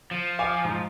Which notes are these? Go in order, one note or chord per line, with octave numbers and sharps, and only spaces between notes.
F3
F5 G#5 D6
G#2